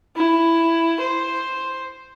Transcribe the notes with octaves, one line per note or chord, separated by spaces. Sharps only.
E4
C5